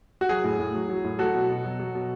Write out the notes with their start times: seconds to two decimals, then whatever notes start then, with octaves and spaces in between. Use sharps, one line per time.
0.21 F#4
0.29 F#3 G#4
0.44 A2
0.59 A2
0.74 F#3
0.89 F#3
1.04 A2
1.19 F#3 F#4 A4
1.35 B2
1.49 B2
1.65 F#3
1.79 F#3
1.95 B2